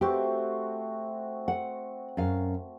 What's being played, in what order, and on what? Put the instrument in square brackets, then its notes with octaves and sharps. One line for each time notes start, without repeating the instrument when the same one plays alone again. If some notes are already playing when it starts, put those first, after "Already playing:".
[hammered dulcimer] A3 C4 F#4 [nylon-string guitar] G4
[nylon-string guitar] F#5
F#2 F5